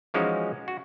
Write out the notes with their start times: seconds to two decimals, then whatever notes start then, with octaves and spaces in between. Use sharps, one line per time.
0.14 E3 F3 G#3 C#4 D#4 F#4
0.68 F#4